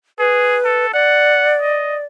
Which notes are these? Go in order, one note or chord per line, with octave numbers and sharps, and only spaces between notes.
G#4 B4
A4
D5 F#5
D#5